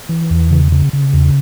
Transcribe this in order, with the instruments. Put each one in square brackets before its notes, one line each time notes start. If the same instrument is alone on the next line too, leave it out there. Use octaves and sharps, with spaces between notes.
[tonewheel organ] E3
E2
C#3
C#3
C#3
E2